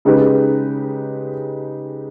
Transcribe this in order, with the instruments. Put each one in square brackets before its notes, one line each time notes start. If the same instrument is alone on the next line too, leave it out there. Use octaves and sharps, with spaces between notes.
[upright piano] C#3 G#3 D#4 G4 B4